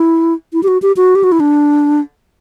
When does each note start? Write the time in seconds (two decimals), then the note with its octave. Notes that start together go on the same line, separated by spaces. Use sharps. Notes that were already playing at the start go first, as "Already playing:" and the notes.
Already playing: E4
0.53 E4
0.63 G4
0.68 F#4
0.82 G4
0.97 F#4
1.15 G4
1.24 F#4
1.32 E4
1.40 D4